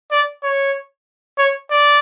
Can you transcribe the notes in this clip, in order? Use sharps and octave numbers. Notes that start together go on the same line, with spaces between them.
D5
C#5
C#5
D5